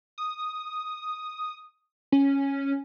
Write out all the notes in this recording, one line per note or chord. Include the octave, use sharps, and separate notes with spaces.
D#6
C#4